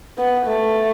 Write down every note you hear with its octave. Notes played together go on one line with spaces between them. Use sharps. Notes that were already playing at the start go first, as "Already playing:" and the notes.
B3
A3